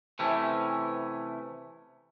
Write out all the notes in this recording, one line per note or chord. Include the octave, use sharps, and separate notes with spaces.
C3 E3 A3 C#4